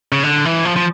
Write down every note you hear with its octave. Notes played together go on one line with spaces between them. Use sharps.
C#3
D3
E3
F3
F3